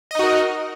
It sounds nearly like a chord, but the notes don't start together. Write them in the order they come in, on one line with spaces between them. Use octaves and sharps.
D#5 D#4 F#4 A#4